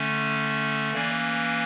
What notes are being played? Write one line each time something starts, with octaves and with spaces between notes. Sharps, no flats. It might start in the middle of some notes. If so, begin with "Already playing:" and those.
Already playing: D3 A3 C#4
E3 A#3 C#4 D5